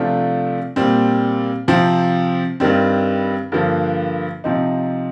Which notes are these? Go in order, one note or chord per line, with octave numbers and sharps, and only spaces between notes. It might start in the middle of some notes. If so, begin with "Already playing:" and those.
Already playing: C3 F3 A3 D4 F4
A#2 G3 C4
C3 F3 C4
G2 D#3 G3 C4
G2 D3 F3 A#3
C3 F3 C4 D#4